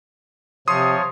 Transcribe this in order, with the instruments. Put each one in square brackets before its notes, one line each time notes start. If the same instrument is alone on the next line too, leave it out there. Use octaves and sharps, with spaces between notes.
[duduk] C3 [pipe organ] F3 C#5 [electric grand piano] C6 D#6